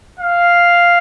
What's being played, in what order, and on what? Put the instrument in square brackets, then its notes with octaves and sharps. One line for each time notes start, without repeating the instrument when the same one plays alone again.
[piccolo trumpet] F5